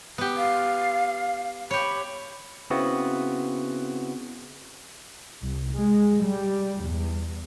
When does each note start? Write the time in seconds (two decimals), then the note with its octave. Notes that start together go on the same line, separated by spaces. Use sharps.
0.18 B3 G4
0.37 F5
1.71 G4 C#5 B5
2.70 C#3 B3 C4 E4 F#4
5.42 C2
5.73 G#3
6.23 G3
6.85 E2